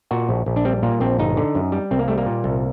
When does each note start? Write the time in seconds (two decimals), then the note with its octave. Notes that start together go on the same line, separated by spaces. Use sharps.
0.11 A#2 F#4
0.29 A#1
0.46 A#1
0.56 D4
0.65 G3 C4
0.83 A#2 A#3
1.00 A#1 C4
1.19 G1 D#4
1.37 D3
1.55 F#2
1.72 G3
1.91 C2 C4
1.99 A#3
2.08 G3 A3
2.18 A#3
2.26 A#2
2.44 C2